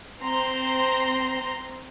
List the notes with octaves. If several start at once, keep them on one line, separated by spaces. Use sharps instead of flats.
C4 A#5 C6